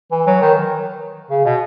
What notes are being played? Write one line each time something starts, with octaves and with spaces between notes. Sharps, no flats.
E3
F#3
D#3
C#3
B2